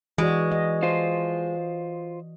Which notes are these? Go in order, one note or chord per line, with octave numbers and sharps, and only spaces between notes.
E3 G#3 F#4 D5
D#5
F4 C5